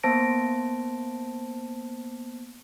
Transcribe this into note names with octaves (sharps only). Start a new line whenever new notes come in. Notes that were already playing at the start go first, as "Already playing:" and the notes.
A#3 B3 C5 A5 A#6 D7